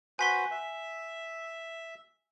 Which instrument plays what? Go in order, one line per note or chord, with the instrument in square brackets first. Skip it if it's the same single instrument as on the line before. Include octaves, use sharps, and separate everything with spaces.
[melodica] F#4 B4 C5 [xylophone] G#5 B6 G7
[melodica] E5